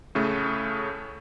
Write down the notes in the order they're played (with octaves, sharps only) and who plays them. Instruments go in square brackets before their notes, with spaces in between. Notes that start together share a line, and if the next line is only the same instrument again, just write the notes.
[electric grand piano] A2 C#3 A3